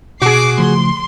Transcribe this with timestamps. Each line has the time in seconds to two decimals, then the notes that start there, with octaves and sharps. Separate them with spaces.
0.22 B2 F#4 G#4 D6 C7
0.58 C#3 F3 A3 C6